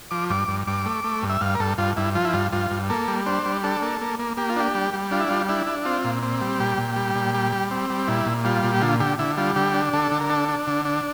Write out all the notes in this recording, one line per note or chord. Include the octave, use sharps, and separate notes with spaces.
F3 D6
G2 D6
G2
G2 D6
A3
A3
G2
E5
G2 F5
A#4
G2 A4
G2 F4
G2 E4
F3 F4
E4
G2 F4
G2 F4
G2
A#3 A4
G3
D4 C5
G3
D4 A4
A#3
A#3
A#3
A#3 G4
F4
D4 G4
G3
G3
D4 F4
E4
G3 F4
D4 E4
D4
C4 F4
A#2
C4
G3
A#2 G4
A#2
G3
A#2
G3
G3
C4
G3
A#2 E4
A#2
G3 F4
A#2
G4
D3 F4
D3 G4
D3 E4
G3 F4
D3 G4
D4
D3 A4
D3
A#4
D4 A4
D4
D3
D4